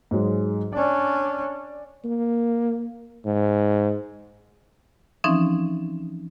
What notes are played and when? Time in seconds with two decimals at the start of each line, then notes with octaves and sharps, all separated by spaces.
0.11 G#2 F#3 G#3
0.73 C#4 D4 D5
2.04 A#3
3.25 G#2
5.24 E3 F3 C4 C#4 D#4